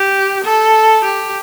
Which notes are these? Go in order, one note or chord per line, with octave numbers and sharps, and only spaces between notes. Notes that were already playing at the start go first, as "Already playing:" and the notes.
Already playing: G4
A4
G4